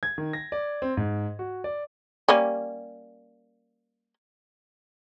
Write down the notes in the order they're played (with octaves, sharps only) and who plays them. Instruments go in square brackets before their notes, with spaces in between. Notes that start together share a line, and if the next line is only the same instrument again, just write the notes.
[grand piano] G#6
D#3
A#6
D5
C4
G#2
F#4
D5
[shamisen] G3 A#3 C#4